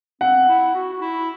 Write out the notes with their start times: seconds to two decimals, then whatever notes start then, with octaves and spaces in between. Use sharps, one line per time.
0.21 C4 F#5
0.49 E4
0.75 F#4
0.93 F#4
1.01 E4